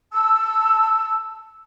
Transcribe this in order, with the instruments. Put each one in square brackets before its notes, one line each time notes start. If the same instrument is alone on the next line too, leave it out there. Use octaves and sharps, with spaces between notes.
[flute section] A5 E6